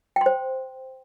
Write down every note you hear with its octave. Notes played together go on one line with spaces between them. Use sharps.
C5 G5 C6